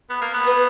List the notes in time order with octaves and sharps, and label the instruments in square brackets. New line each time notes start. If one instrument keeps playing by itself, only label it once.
[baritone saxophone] B3
A#3
B3
[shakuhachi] B4